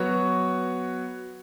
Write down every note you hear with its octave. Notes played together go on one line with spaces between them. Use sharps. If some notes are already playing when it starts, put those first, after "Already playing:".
Already playing: F#3 B3 F#4 C#5